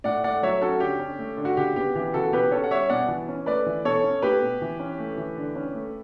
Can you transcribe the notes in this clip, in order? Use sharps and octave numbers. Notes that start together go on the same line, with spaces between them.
A2 D5 F#5
A3 D5 F#5
F#3 C#5 E5
C#4 F#4 A4
D3 G4
C#4
A3
D3
F#4
C#3 G4
B3 G4
E3 G4
C#3 F#4 A4
B2 G4 B4
C#4 A4 C#5
F#5
G3 C#5 E5
B2 D5 F#5
E3
C#4
A3 B4 D5
E3
B2 A4 C#5
C#4
A3 G4 B4
B2
E3
C#4
A3
E3
D3
C#4
A3